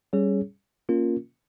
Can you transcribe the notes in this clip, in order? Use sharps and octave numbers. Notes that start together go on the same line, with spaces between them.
G3 C#4 G#4 C#5
A#3 C#4 F4 A#4